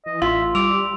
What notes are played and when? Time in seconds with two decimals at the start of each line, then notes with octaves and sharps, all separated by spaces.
0.06 E3 D#5
0.22 A1 F4 E5 C6
0.55 G3 D6 E6 F7